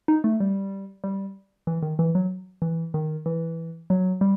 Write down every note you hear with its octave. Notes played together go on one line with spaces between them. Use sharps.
D#4
A3
G3
G3
E3
D#3
E3
F#3
E3
D#3
E3
F#3
G3